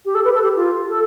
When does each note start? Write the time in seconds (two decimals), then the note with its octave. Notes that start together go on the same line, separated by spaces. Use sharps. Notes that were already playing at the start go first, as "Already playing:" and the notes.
0.05 G4
0.15 A4
0.25 B4
0.34 A4
0.43 G4
0.56 F4
0.89 A4